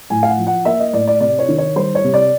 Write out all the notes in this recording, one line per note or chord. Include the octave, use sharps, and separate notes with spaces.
A2 G#5
F5
F#5
F3
F#5
A#3 E5
D#5
A2 D5
D5
C3 D5
C#5
D#3
C#5
G3 C5
C#5
C3
D5